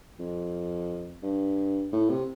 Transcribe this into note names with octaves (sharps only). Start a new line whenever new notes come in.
F2
G2
A2
C3